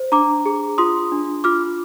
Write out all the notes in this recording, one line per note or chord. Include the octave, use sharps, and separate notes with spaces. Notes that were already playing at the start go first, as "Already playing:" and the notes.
Already playing: C5
D4 A#5 D6
G#4
F4 C6 D#6
D4
F4 D6 F6